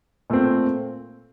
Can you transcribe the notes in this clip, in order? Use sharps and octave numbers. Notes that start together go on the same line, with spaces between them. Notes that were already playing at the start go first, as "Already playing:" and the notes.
A#2 A3 C4